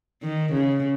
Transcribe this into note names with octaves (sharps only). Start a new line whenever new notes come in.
D#3
C#3